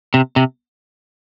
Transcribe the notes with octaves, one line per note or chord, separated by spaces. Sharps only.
C3
C3